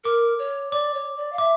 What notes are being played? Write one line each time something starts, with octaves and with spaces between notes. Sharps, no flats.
A#4 D6
C#5
D5 D6
C#5
D5
F5
E5 D6